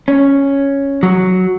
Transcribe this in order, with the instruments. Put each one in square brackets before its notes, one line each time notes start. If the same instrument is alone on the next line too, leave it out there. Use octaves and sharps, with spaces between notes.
[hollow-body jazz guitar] C#4
F#3